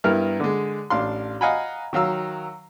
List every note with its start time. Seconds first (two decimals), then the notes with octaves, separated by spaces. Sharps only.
0.04 G2 B3 E4 A#4 F6
0.40 D3 G#3
0.90 A1 D4 F5 C6
1.41 D#5 F5 F#5 G#5 A#5 B5
1.93 D#3 F#3 F5 E6